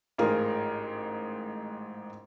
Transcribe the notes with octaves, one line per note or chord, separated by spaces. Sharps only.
A1 G#2 F4 G#4 A#4